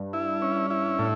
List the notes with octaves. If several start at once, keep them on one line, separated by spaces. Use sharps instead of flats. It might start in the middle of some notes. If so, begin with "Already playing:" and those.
Already playing: G2
E4
C#4
E4
A2